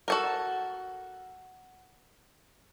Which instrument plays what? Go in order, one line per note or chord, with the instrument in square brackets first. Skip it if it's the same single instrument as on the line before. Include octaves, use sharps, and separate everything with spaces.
[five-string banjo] F#4 A4 A#4